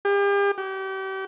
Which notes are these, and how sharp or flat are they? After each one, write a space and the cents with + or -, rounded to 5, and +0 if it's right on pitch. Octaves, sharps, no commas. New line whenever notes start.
G4 +40
G4 -35